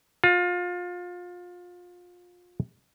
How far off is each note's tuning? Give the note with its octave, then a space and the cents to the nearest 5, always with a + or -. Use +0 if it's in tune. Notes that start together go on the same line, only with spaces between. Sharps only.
F4 +25